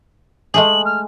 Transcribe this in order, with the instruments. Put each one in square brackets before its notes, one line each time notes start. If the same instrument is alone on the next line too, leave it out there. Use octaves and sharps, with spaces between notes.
[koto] G#3 A3 G#4 [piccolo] F#7
[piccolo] F6